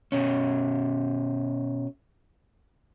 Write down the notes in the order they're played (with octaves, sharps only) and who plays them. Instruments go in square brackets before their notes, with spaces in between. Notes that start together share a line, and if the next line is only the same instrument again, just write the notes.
[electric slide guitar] B2 C#4